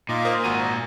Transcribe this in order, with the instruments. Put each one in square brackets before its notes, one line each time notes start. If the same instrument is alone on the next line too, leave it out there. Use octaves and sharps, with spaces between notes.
[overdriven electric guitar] A#2 [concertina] D#4 F4 D6
[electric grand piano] A#4 C5 D#6
[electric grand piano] G#1 A#5 D#7 [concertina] F#4